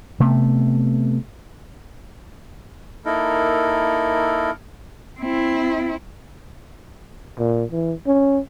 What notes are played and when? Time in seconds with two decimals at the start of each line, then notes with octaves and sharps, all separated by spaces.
0.20 C3 A3 B3
3.05 A#3 D#4 E4 A4 A#4
5.20 C4 E4
7.39 A#2
7.72 E3
8.07 C#4